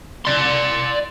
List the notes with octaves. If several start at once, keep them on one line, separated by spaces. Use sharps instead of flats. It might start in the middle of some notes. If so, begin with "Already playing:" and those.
D5 C6